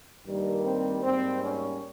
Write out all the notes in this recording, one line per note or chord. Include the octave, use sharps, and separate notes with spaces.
G2 D#3 G3 A#3
C4
G#2 G3 A#3 C4
C#4